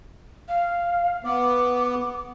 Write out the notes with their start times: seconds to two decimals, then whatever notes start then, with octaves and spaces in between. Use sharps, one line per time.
0.48 F5
1.25 B3 D6